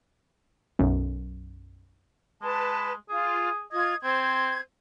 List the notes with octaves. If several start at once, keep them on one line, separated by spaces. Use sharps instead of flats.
B1 F#2
G#3 B4 A5
F4 G#4
F4 D#5 G#6
C4 C5 G#6